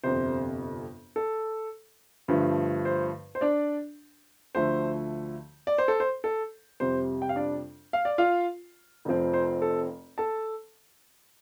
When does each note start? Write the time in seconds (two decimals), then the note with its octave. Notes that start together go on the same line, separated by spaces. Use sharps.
0.04 G1 F2 C3 C5
1.16 A4
2.28 G2 D3 F3 A3
2.85 C5
3.35 C5
3.41 D4 D5
4.55 D2 D3 F3 A3 C5
5.67 D5
5.78 C5
5.88 A4
6.00 C5
6.24 A4
6.80 F2 C3 G3 C5
7.22 G5
7.29 F5
7.36 D4 D5
7.93 F5
8.05 D5
8.18 F4 F5
9.05 F1 F2 F3 C4
9.34 C5
9.62 A4
10.18 A4 A5